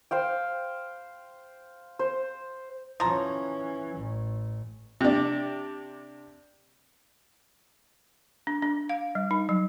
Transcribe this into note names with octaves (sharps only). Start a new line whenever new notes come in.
C5 F5 G5
C5
E3 F3 C#4 A#5
A1
C3 D4
D4
D4
F5
G3
D#4
F#3